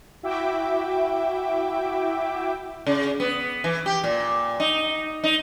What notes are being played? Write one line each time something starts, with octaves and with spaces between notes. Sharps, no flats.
E4 F#4 E5 G5 D6
C#3
B3
E3
G4
A#2
D#4
D#4